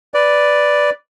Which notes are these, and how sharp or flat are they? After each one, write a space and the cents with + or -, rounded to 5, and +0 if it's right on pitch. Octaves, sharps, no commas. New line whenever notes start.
B4 +0 D5 +0